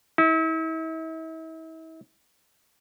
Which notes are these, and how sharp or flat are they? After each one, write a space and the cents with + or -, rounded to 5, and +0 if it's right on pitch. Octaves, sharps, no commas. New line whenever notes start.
E4 -40